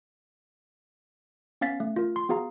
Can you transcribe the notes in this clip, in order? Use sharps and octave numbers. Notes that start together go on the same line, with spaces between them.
B3 C#4 F5 A6 B6
A3
F4 A#4
C6
B3 F#4 G#4 F5 A#5